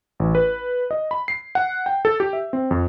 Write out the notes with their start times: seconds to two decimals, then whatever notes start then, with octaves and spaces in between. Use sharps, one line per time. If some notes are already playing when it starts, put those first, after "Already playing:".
0.20 A1
0.35 B4
0.91 D#5
1.11 B5
1.28 C7
1.55 F#5
1.86 G5
2.05 A4
2.20 G4
2.33 E5
2.53 C4
2.71 F2